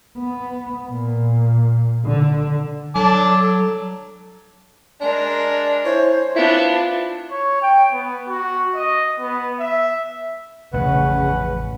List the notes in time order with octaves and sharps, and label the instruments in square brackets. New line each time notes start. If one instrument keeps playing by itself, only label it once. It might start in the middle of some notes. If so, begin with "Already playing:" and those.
[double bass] B3
A#2
D3
[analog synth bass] F#3 [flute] A4 [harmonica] A5 D6
[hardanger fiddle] G#3 A#4 [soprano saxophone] D4
[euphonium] E4 [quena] C5 [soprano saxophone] C#5
[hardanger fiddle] B3 D4 [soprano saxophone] E4 [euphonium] F4
[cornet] C#5
G5
B3
F#4
D#5
B3
E5
[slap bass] A1 F2 [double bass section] A2 C#3 C#4 [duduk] B4 [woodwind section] F#5